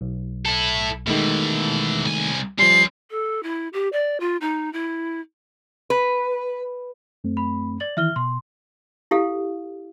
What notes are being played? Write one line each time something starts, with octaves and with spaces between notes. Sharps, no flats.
B1
E4 A4
B2 D#3 E3 G#3 A3
C2 G#5
F3 G3 C#4 C6 C7
A4
E4
G4
D5
F4
D#4
E4
B4
F#2 A3 C4
B5
D5 A6 F#7
D#3 E3 E4 E5 F6 G7
B2 C6
E4 G4 A4 F5